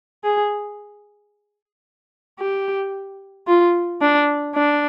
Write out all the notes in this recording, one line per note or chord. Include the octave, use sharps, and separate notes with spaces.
G#4
G4
F4
D4
D4